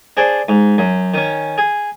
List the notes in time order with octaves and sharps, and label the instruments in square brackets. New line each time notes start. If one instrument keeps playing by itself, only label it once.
[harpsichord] D4 G#4 C5 D5
G#2
F#2
D#3 C#4
G#4